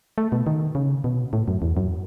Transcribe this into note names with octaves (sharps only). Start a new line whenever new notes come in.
A3
B2
D#3
C#3
B2
A2
F#2
E2
F#2